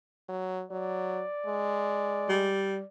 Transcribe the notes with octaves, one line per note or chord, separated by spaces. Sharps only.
F#3
F#3 D5
G#3
G3